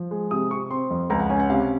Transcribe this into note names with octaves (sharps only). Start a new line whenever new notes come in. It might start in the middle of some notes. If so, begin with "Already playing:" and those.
Already playing: F3
G#3
C3 D#6
C3 C#6
C4 C6
F2
C#2 A#5
F#5
C#4 G#5
F#5
C3 F5